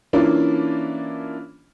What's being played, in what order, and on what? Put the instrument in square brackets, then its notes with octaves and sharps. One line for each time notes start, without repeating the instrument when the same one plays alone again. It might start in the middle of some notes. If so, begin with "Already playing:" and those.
[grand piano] E3 A#3 C#4 D4 E4 F4